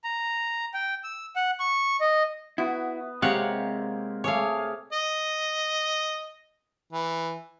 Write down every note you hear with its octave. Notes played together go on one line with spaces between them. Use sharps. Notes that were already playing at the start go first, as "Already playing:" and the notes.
A#5
G5
E6
F#5
C#6
D#5
B3 E4 F#4
C3 G#3 A#3 C4 G4 C#5 F5 F#5
A3 G#4 C#5 F5 D6
D#5
E3